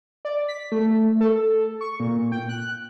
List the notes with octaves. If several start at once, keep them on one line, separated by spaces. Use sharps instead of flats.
D5
B6
A3
A4
C#6
A#2
G5
F#6